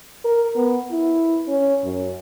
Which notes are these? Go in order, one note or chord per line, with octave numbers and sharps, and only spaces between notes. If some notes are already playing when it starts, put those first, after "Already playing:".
A#4
B3
E4
C#4
F#2